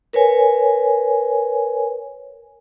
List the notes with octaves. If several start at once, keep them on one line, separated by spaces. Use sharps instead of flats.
A#4 B4 C#5 G#5